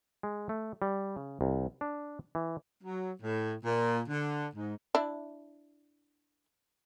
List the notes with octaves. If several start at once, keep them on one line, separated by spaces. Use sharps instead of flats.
G#3
A3
G3
C#3
C2
D4
E3
F#3
A2
A#2
D3
G#2
D4 E4